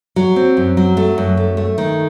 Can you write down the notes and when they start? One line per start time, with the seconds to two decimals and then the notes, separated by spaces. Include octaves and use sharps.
0.16 F#3
0.36 C4
0.57 F#2
0.77 F#3
0.97 A3
1.18 F#2
1.37 A3
1.57 A3
1.78 D#3